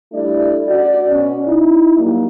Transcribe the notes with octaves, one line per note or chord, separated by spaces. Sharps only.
G3 A3 D4 E4 D5
C#4 F#4 D5
B2 C#4
D#4 E4
F#3 G3 A#3